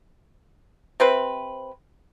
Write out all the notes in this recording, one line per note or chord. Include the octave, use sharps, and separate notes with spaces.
C3 C4 B4